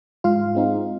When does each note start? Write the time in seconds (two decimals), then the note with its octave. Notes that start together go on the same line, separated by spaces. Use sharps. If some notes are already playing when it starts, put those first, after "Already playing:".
0.24 G#2 F4 F5
0.55 G#3 C4 D#4